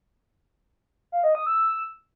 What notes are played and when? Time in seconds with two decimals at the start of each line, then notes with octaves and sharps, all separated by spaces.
1.12 F5
1.24 D#5
1.35 D#6
1.46 E6